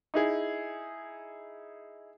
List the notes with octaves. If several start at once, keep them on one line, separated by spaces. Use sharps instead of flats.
D#4 E4 G#4